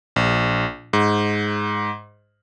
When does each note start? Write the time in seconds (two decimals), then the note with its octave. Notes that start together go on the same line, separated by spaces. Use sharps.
0.16 A#1
0.93 G#2